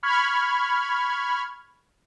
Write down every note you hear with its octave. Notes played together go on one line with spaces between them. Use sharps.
B5 C#6 F6 G#6